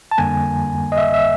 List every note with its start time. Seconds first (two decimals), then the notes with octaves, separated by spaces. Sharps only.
0.11 A5
0.18 F2 D3 G3 A#3 G#5
0.92 D#5
0.98 E5
1.14 E5